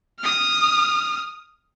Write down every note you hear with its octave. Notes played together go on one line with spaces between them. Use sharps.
D#6 F6